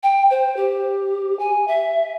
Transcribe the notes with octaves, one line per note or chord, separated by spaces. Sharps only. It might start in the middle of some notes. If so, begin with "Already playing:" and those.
G5
C5
G4
G#5
E5